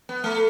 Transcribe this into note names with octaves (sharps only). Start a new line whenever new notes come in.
B3
A3